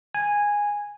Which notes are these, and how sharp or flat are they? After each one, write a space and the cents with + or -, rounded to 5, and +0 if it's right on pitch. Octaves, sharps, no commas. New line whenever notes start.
G#5 -10